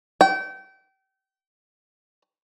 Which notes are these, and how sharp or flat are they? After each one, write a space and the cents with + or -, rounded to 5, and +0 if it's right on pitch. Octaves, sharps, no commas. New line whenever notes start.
G5 -30